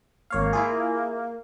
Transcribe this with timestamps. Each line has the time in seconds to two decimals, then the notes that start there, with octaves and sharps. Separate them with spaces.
0.30 G#1 A#3 C#5 F5
0.53 E4 F4 G#4